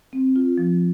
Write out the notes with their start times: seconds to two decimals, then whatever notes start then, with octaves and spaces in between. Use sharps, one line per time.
0.13 C4
0.36 F4
0.58 F3